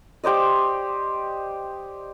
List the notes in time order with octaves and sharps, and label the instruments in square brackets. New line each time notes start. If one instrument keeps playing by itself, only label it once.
[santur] G4 C5 D5 D#5